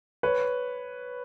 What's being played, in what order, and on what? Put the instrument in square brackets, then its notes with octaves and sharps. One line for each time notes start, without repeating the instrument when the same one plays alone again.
[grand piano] B4 C#5